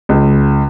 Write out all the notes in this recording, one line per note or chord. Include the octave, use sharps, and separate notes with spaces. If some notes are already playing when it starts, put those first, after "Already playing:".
C#2